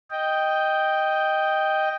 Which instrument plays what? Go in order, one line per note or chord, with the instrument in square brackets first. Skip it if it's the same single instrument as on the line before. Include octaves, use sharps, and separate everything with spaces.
[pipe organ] D#5 G5